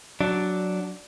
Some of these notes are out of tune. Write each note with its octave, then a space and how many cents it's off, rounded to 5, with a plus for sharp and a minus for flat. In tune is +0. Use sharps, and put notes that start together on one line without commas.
F#3 +0 D4 -5